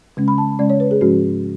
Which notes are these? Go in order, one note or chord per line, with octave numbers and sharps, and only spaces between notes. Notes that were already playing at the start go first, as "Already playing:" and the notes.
C#3 G#3 C#4
B5
A5
C#3 G#3 C#4 D5
C#5
B4
G#4
G#2 F3 G#3 C#4 F#4